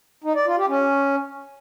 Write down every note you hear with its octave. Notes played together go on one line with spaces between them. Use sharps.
D#4
D5
F4
G4
C#4